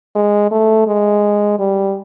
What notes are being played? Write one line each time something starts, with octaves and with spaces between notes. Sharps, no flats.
G#3
A3
G#3
G3